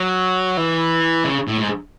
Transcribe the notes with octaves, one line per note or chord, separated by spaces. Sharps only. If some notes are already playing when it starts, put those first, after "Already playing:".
Already playing: F#3
E3
C#3
A2
G#2